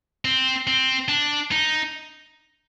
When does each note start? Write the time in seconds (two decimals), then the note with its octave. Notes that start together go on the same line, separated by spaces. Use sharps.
0.25 C4
0.67 C4
1.08 D4
1.51 D#4